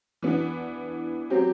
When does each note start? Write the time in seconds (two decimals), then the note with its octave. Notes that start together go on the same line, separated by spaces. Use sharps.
0.22 E3 B3 D4
1.30 F#3 C4 G4